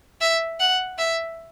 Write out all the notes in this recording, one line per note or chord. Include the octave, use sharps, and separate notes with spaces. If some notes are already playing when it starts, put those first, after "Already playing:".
E5
F#5
E5